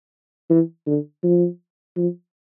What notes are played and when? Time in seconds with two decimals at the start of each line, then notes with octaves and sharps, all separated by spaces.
0.50 E3
0.86 D3
1.23 F3
1.96 F3